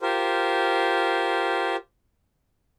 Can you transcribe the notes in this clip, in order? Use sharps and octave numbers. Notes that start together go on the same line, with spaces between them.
F4 G4 A#4 C5